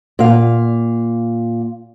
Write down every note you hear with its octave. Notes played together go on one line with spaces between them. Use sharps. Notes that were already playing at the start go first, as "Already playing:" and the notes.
A#2 F5